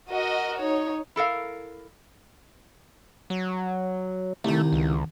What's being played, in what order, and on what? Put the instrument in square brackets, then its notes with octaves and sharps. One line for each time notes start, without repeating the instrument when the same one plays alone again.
[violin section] F#4 D#5 [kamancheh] A#4
[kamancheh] D#4 [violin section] C#5
[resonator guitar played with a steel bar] E4 A4 A#4 F5
[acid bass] F#3
[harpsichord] C2 D#3 [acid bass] A3
[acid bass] C#2